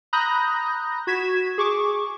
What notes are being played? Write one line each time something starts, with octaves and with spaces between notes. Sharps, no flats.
A#5 B5 D#6 F#6 G6 A#6
F#4 G#6 B6 E7
G#4 C#6 D6